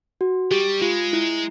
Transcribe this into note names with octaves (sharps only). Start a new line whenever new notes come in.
F#4
G3 G4
G#3 F4
E4